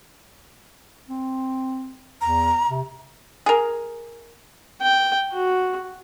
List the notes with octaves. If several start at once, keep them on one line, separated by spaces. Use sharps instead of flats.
C4
E2 A#5
C3
G#4 A#4
G5
F#4